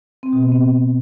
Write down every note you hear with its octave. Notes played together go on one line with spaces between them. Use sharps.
C4
B2
B3
C4